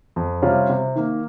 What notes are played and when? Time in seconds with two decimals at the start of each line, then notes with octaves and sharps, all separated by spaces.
0.16 F2
0.42 C3 G3 C#4 F4
0.69 C3
0.96 D#3 A#3